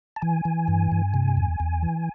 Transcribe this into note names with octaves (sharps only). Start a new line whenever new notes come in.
A5
E3 G#5
E3
G2
G2
C3
E2
E2
E3